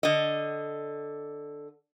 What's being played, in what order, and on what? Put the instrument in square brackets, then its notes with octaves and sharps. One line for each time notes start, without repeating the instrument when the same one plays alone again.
[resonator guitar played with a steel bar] D3 D#5